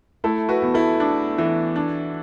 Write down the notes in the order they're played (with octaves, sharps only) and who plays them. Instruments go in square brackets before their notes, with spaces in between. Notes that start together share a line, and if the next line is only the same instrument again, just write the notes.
[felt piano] A3 [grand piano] E4 A4
[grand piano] F#4 B4
[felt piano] E2
[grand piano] E4 A4
[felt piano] D4
E3
D4